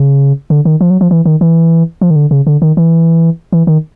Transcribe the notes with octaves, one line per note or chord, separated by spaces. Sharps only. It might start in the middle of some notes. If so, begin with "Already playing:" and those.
Already playing: C#3
D3
D#3
F3
F#3
F3
E3
D#3
E3
F3
D#3
D3
C#3
D3
D#3
E3
E3
D#3